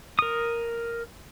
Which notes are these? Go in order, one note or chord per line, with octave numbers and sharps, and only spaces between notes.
A#4 D#6